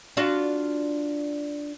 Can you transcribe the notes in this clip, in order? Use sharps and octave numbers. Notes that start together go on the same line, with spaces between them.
D4 F4 F#4